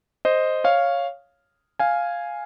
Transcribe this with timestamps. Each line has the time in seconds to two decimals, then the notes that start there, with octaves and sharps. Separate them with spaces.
0.25 C5 D#5
0.64 C#5 F5
1.79 F5 G#5